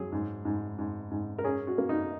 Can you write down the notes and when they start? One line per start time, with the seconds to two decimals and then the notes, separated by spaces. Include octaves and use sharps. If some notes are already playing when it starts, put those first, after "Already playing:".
Already playing: F#3 G#4
0.12 G#2
0.45 G#2
0.78 G#2
1.11 G#2
1.38 A#4
1.44 C#4 G#4
1.67 F#4
1.78 A#3
1.89 D#4